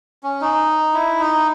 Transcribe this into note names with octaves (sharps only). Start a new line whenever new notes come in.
C#4
D#4
E4
D#4